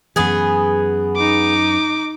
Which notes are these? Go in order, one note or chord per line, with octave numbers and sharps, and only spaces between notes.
F#2 E3 B3 G#4
D#4 D6